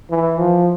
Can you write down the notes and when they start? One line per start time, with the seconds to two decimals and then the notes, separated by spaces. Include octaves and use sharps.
0.10 E3
0.39 F3